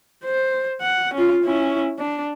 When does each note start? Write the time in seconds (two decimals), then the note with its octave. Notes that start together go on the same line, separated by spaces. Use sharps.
0.25 C5
0.81 F#5
1.14 C#4 F4
1.43 C#4 E4
1.99 D4